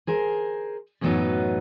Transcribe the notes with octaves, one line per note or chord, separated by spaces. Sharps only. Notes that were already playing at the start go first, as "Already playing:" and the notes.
G#4 A#4 C5
F#2 A2 E3 F#3 B3 D#4